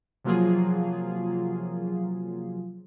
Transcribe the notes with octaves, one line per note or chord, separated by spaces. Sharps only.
C3 F3 F#3 A#3 F4 G#4